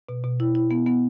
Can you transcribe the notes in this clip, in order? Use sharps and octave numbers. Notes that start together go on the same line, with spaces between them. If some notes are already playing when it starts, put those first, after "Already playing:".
B2
B2
E4
E4
B3
B3